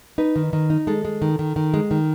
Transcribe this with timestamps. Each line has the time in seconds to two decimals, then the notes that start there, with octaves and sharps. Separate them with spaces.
0.18 D#4 B4
0.36 D#3
0.53 D#3
0.70 D#4
0.87 G#3 A4
1.05 G#3
1.22 D#3
1.39 D#3
1.56 D#3
1.74 G#3
1.91 D#3